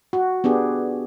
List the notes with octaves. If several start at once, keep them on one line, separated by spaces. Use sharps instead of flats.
F#4
B3 D4 G4 G#4